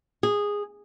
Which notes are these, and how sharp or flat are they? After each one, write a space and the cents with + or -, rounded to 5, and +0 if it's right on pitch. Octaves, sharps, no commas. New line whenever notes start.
G#4 -15